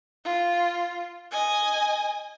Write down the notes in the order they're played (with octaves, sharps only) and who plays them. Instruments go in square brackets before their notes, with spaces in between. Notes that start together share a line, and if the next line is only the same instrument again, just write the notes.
[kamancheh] F4
D#5 G#5